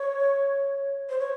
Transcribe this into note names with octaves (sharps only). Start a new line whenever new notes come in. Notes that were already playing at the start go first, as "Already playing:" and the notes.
Already playing: C#5
C5
C#5